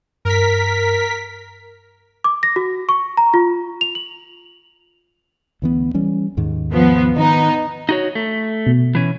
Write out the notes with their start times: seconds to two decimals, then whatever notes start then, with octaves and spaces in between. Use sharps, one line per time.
0.25 G2 A#4 B6
2.24 D6
2.43 A#6
2.56 F#4
2.89 C#6
3.17 A#5
3.34 F4
3.81 F7
3.95 F#7
5.62 D2 E3 B3
5.94 E3 G3 C#4
6.37 D#2 G#2 D#3
6.72 F3 B3
7.16 D#3 B3 D#4
7.89 D#4 F#4 C#5
8.15 A3
8.67 B2
8.95 E3 C#4